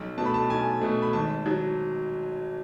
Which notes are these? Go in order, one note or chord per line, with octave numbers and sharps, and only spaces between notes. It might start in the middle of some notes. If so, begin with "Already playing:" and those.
Already playing: B1
B2 A3 A5
B5
A5
B1 G#5
B2 A3
B5
G#1 A5
F#3